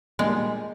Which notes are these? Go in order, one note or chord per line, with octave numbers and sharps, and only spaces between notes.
A#2 G3 G#3 A#3 D4